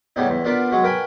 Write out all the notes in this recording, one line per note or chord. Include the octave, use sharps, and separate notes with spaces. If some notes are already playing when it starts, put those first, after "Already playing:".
A2 C#3 G3 B3 D#4
E2
B3 D4 F4 A#4 B4
F#3 G#3 F#4
A#4 B4 G5 G#5 B5